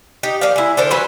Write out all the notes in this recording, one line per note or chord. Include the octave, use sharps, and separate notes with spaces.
D#4 G4
F3 A#3 D5 F5
G#3 E4
D3 D4 A#4 C5
E3 F#3 B4 C5